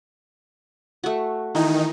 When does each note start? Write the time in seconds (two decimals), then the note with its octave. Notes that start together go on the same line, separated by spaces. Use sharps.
1.04 A3 F#4
1.55 D#3 E3 D#4